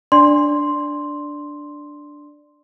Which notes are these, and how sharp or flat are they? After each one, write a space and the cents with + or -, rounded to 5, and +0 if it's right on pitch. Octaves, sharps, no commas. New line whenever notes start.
D4 +0 D5 +0 C6 +0